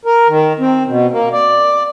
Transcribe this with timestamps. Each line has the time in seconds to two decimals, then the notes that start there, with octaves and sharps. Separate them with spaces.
0.05 A#4
0.28 D#3
0.60 C4
0.87 B2
1.12 A#3
1.32 D5